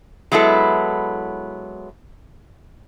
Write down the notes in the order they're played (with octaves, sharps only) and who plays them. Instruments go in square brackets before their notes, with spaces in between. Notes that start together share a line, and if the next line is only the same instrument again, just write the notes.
[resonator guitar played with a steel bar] F#3 G#3 B3 E4 A4